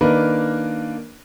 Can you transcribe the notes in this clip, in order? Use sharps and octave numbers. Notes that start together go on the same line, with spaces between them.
D#3 A#3 D4 A#4 B4